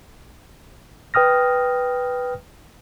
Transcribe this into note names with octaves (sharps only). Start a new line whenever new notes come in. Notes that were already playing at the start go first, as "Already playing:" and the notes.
B4 G5 D#6 F6 A#6